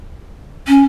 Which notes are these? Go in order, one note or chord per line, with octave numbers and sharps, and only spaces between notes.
C#4